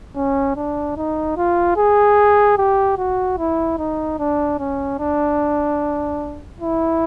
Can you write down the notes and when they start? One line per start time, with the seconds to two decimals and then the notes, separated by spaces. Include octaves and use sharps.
0.16 C#4
0.56 D4
0.97 D#4
1.37 F4
1.77 G#4
2.58 G4
2.98 F#4
3.38 E4
3.78 D#4
4.19 D4
4.59 C#4
4.99 D4
6.61 E4